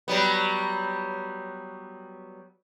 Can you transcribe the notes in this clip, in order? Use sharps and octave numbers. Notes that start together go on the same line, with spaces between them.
F#3 G3 B3